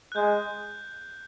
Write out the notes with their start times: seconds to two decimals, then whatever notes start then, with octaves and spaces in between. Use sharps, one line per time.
0.12 F#6
0.16 G#3 G6